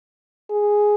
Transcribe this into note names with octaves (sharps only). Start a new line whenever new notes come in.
G#4